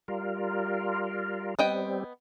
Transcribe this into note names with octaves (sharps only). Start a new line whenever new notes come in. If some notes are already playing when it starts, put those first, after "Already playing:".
G3 F4 A#4
G3 B3 C4 D#5 G5